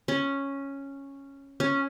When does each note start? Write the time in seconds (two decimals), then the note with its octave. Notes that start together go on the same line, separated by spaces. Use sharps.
0.08 C#4
1.60 C#4